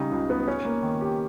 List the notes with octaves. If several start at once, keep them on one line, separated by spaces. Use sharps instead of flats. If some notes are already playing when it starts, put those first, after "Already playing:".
Already playing: C#3 G3 D#4
C#2
B3
C#4
A#3
D#3
G4